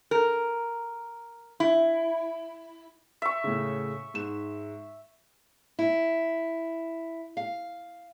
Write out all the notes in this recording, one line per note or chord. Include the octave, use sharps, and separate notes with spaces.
A#4
E4
E5 C#6
A2 C#3
G#2 E7
E4
F5